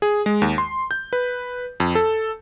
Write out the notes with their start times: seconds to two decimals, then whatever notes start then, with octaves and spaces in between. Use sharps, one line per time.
0.02 G#4
0.26 G#3
0.42 D#2
0.58 C6
0.91 G6
1.13 B4
1.80 F2
1.95 A4